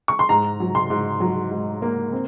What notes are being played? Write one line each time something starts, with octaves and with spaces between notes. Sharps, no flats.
C#6
C6
G#2 A#5
F#3
C6
G#2
F#3
G#2
A#3
C4